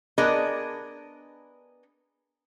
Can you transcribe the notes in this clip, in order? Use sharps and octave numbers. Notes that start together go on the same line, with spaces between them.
B3 D4 G#4 A#4 D#5